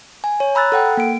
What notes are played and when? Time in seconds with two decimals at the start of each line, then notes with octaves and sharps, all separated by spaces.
0.24 G#5
0.40 C#5
0.55 A#5 B5 E6 F#6 A6
0.72 A4 F#5 G5
0.97 A#3 D7